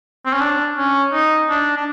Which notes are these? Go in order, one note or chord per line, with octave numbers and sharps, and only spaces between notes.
C4
C#4
D4
C#4
D#4
D4
D4